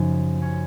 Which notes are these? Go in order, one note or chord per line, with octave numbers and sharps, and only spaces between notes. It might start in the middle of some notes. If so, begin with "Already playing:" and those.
Already playing: F#2 C#3 F3 C#4 D#4
C#4